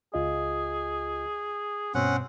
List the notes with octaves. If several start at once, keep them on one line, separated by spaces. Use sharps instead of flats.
C#2 F4 G#4 D#5
G2 B2 C4 C#4 F#5